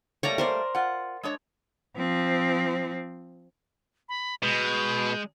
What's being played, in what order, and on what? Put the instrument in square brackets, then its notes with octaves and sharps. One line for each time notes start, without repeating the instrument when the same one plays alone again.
[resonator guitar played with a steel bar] G3 A3 A#3 [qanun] C#5 D5 A#5
[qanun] A#4 C5 D5
[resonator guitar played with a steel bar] F4 F#5
G#3 D4 C#5
[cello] F3 C4
[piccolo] B5
[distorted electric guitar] B2 [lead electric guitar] G#3 [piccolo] G6